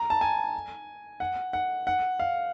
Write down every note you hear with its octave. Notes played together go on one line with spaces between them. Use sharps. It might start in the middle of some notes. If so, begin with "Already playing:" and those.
Already playing: A#5
A5
G#5
F#5
F#5
F#5
F5